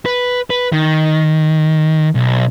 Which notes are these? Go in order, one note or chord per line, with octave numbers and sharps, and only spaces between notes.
B4
B4
D#3
B1